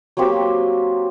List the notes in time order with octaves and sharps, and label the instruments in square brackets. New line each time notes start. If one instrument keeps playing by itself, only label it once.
[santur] F#3 A#3 C4 G4